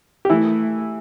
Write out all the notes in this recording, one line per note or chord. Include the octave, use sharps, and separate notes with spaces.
G4
E3 A3 E4